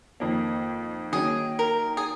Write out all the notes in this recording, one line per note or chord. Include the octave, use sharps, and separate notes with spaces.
F2 D#3 A#3
D#3 F#3 A#3 D#4 G#4
A#4
G#4